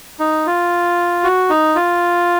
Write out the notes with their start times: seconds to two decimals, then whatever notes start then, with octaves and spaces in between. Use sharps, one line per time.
0.19 D#4
0.46 F4
1.24 F#4
1.50 D#4
1.75 F4